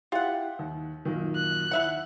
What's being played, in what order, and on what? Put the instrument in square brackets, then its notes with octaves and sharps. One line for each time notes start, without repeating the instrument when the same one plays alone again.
[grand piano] E4 G4 [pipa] F4 F#5
[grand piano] D#2
F#2 A#2 D#3
[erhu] F#6
[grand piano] D#2 [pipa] E4 E5 F#5